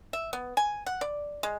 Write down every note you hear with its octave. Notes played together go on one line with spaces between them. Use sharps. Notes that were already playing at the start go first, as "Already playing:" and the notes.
E5
B3
G#5
F#5
D5
G#3